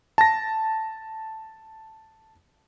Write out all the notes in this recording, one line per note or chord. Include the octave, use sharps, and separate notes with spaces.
A5 A#6